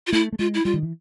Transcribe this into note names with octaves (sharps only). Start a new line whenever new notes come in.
F4
A3 E4
A3
G#3 F4
E4
G3 F4
D#3
E3